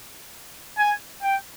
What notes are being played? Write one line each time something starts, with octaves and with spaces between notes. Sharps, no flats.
G#5
G5